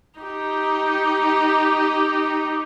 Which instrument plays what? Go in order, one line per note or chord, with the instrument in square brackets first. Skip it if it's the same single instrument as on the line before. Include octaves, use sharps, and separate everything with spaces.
[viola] D#4 G4